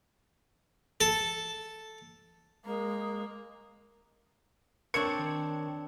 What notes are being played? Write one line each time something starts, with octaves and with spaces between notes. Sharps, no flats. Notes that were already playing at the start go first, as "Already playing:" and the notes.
A4
G#3 A#3
A#3 C4 D4 C#5 C#6 G#6 C#7
D#3